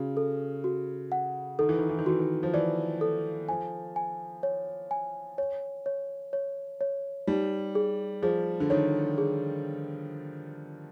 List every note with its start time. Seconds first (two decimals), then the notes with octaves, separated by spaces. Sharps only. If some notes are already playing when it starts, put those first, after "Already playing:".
Already playing: C#3 F#4
0.17 A4
0.64 F#4
1.12 F#5
1.59 D#3 A4
1.69 E3
1.79 D#3
1.89 E3
1.99 D#3
2.06 E3 F#4
2.19 D#3
2.43 F3
2.54 E3 D5
3.01 A4
3.49 F3 G#5
3.96 G#5
4.43 C#5
4.91 G#5
5.38 C#5
5.86 C#5
6.33 C#5
6.81 C#5
7.27 G3 D#4
7.75 G#4
8.23 F3 G#4
8.60 D3
8.70 D#3 C#5
9.18 G#4